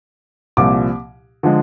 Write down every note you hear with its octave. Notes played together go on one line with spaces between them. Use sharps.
C2 A#2 F3 D6
D3 F3 G#3